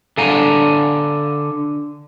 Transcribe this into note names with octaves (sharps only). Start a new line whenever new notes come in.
D3 A4 F5 F#5 G#5 A#5